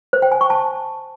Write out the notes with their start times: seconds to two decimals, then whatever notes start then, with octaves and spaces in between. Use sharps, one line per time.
0.13 C5
0.22 G5
0.32 G#5
0.41 C#6
0.50 A5